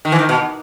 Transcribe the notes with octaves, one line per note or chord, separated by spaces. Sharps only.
D#3
E3
D#3
B2